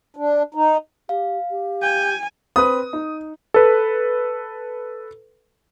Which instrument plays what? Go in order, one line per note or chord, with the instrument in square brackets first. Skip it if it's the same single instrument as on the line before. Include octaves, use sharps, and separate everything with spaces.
[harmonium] D4
D#4
[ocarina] G4 [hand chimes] F5
[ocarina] G4
[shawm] G5 [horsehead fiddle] G#5
[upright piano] C4 B4 C5 [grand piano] D#6
[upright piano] D#4
[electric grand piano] A4 B4